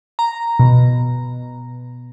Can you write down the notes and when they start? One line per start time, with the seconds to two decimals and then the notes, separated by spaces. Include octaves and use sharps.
0.19 A#5
0.60 B2